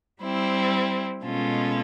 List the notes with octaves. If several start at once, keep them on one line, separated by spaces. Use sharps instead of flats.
G3 C4 E4
B2 G#3 C#4 F4 A4